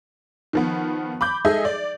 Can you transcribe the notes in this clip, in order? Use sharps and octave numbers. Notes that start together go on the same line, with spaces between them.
D#3 F3 B3
B5 D6 G6
G#3 D#4 G#4 A4 D#5 E5
D5